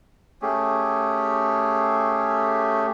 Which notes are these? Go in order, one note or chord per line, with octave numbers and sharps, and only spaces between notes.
A3 C#4 G4 G#4